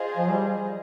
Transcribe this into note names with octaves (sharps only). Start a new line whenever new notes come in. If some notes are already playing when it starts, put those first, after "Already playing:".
Already playing: F4 G#4 C5 D#5
F3
G3